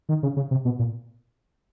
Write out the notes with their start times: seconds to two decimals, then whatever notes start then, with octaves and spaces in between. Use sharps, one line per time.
0.09 D#3
0.23 C#3
0.37 C#3
0.51 C3
0.65 B2
0.79 A#2